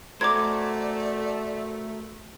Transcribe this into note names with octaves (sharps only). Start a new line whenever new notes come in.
A3 F#4 A#4 C5 D5 D6 G#6